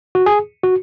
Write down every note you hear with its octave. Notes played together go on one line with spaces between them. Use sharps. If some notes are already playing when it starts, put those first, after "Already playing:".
F#4
G#4
F#4